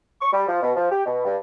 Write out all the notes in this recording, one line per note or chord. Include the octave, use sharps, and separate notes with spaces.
C#6
G3
F3
B2
F3
G4
B2
G2